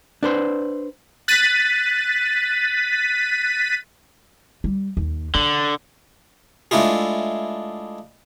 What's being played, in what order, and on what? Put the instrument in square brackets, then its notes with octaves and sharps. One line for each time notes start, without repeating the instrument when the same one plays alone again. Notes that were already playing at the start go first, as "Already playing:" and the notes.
[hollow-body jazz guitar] D4 B4 C5
[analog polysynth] F#6 A6 B6 D#7
[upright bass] G3
D#2
[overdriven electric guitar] D3 [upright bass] D4
[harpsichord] G#3 A3 D4 E4 F4 G#4